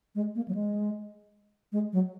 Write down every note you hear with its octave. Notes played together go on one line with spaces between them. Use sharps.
G#3
A#3
F#3
G#3
G#3
F#3